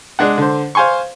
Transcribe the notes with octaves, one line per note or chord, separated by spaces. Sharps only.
G#3 D4 F#5
D3 C5
C5 F5 G#5 C6 C#6